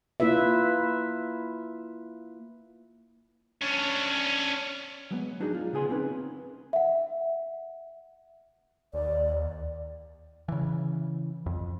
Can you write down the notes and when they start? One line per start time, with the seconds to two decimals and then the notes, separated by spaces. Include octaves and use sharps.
0.20 A#3 E4 F4 B4 E5
3.61 C#4 D4
5.11 F#3 G#3 A#3 B3
5.40 F#3 D4 D#4 F#4 G#4
5.55 F4
5.73 C#3 B3 G#4 G#5 C6
5.89 A#3 C4 C#4 D#4 A#4 B4
6.73 E5 F#5
8.94 D#2 D5
10.48 C#3 E3
11.46 F2